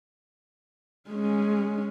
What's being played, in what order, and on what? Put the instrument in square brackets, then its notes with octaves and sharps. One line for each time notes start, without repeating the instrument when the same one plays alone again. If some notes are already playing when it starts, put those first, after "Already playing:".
[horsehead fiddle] G#3 C#4